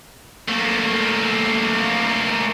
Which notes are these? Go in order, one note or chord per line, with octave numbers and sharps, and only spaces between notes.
A3 A#3